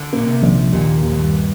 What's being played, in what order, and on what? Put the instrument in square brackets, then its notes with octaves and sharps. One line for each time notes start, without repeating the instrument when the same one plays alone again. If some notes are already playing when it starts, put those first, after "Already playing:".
Already playing: [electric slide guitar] D3
[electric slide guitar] A#2 [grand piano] A#3
[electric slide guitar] C3
[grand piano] A#1
[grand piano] D#2 [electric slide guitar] A#2
[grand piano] D#2
[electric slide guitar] F2
G2